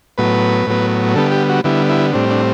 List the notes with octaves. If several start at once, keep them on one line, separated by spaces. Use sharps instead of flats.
A2 F#3 B3 B4
A2 F#3 B3
D3 G3 B3 A4
G4
F#4
D3 G3 B3 E4
E4
A2 G3 C4 D4
D4